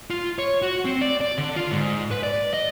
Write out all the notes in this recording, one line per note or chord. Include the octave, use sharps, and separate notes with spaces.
F4
C#5
F#4
C4
D5
D5
D3
F4
G#2
B4
D5
D#5